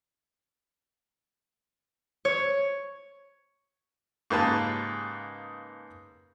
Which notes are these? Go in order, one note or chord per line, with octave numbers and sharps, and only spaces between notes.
C#5
G#2 C#3 A#3 G4 B4 A5